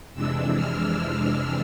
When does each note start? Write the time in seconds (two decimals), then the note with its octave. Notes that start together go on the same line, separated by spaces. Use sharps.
0.13 F2 C3 E3 G#3 D4 E6
0.55 F6
0.95 F6